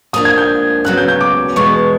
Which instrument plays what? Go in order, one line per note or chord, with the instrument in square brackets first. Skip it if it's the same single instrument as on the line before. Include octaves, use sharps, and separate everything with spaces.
[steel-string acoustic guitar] F3 A#3 D4 [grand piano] D#6
[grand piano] G#6
G6
[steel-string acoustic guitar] D#2 C#3 F#3 B3 [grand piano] F#6
[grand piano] G6
G6
D6
[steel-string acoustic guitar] E2 B2 G#3 [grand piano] C#6